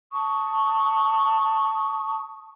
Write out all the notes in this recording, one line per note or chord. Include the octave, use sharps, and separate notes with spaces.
A5 C#6 D#6